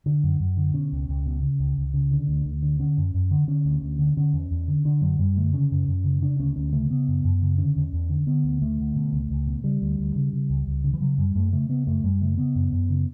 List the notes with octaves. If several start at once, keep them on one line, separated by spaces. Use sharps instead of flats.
D3
F#2
F#2
D3
B2 C#4
C#2
C#2
B2
C#3
C#2
C#2
C#3
D3
D2
D2
D3
D3 C#4
F#2
F#2
D3
D3 C#4
D2
D2
D3
D3 C#4
E2
E2
D3
D3 D4
F#2 F#3
F#2 G3
D3 A3
C#3 C#4
F#2
F#2
C#3
C#3 D4
D2 C#4
D2 C#4
C#3 A3
C#3 B3
F#2
F#2
C#3
D3 C#4
E2
E2
D3
D3 B3
D2
D2 A3
D3
B2
C#2
C#2
B2
C#3 G3
D2
D2
C#3
C#3
C#2
C#2
C#3
E3
C#3 F#3
F#2 G3
F#2 A3
C#3 A3
C#3 B3
F#2 A3
F#2 G3
C#3 A3
C#3 B3
F#2
F#2
C#3